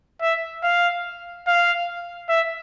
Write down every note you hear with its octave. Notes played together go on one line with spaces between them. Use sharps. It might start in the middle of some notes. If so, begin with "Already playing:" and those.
E5
F5
F5
E5